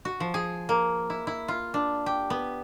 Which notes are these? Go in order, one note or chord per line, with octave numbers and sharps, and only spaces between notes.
F#4
F3
G#4
A#3
E4
E4
F4
D4
G4
B3